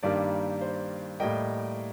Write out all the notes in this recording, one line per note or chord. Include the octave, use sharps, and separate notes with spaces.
G2 D#3 G3 A#3 D5
C5
A2 G3 A#3 D#5 G5